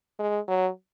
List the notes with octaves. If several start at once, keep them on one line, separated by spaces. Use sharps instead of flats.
G#3
F#3